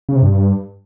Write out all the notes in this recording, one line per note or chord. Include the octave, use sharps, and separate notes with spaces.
C#3
C3
G2